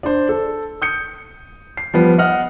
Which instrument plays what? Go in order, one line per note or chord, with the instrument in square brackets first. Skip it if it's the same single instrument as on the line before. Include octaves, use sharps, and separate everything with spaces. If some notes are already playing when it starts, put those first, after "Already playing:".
[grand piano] D4 C5
A4
D#6 G6 C#7
C7
F3 G3 B3
D#5 F#5 F6